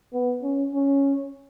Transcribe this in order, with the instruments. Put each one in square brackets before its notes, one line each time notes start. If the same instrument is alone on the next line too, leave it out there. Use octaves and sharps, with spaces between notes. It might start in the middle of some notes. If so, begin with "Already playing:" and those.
[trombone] B3
C#4
C#4